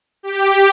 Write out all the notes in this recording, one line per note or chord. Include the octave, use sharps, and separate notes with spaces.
G4